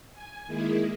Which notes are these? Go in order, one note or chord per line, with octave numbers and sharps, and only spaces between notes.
G#5
D#3 G#3 A#3 E4 G#4